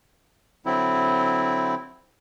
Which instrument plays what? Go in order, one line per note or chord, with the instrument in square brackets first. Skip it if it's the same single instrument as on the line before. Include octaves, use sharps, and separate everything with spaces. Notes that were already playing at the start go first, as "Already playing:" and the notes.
[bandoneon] D3 F#3 C4 E4